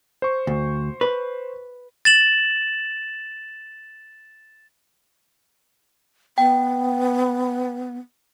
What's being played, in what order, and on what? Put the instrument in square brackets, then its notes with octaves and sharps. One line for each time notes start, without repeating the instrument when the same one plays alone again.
[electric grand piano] C5 C#6
[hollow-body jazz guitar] D2
B4
[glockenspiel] A6 E7 F#7
[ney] B3 [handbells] G5